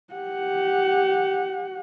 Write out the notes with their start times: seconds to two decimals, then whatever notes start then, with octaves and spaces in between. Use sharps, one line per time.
0.13 G4 F#5